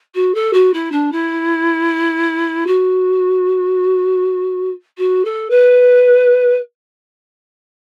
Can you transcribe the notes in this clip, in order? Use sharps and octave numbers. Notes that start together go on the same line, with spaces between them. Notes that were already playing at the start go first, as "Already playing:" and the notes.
F#4
A4
F#4
E4
D4
E4
F#4
F#4
A4
B4